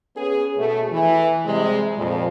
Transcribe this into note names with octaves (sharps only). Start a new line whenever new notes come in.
B3 C#4 G#4
B2 A3
E3
C3 G3 G#3
F2 A#2